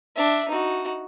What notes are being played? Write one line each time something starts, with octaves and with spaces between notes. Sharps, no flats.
D4 E5
D#4 F#4